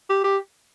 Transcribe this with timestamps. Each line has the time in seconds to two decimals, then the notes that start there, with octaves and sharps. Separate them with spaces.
0.09 G4
0.24 G4